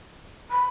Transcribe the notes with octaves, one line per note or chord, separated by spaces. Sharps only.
B5